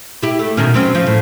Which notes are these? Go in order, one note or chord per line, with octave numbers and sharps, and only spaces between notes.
E4 G4
A3
B2 D#3 C#4
F#3 C4 C#4
F3
A2